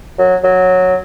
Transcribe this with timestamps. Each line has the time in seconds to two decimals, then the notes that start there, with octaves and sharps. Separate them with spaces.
0.18 F#3
0.44 F#3